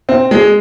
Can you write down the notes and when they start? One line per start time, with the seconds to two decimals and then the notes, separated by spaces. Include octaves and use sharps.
0.09 C4
0.31 G#3